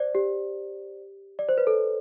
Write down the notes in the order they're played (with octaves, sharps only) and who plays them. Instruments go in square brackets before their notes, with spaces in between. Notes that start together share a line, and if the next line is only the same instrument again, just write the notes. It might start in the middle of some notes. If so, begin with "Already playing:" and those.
Already playing: [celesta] C5 D5
G4
D5
C5
B4
A4